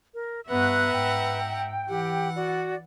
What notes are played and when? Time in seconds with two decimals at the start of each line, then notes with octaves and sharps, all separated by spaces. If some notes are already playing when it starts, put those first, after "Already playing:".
0.14 A#4
0.48 G2 B3 B4 E5 F#5 A#5 F#6
0.94 G#2 G5
1.89 E3 G4 F#5
2.36 F#4 D5